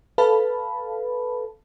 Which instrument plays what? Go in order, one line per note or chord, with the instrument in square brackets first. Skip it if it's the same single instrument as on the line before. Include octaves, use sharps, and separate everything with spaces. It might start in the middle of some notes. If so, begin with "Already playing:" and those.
[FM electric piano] A4 B4 F5 A5 B5